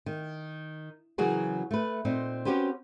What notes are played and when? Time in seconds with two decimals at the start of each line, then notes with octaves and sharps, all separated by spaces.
0.06 D#3
1.18 C#3 E3 F#3 F#4 G#4 A#4
1.71 A3 B4
2.05 A#2 C4 D#4
2.45 C4 C#4 F#4 G4 B4 C5